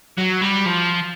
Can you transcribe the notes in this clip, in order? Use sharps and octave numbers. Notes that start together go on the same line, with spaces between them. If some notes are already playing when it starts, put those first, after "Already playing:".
F#3
G3
F3